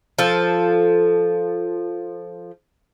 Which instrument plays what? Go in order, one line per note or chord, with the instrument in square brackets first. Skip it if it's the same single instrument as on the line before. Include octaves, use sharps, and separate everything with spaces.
[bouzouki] F3 A4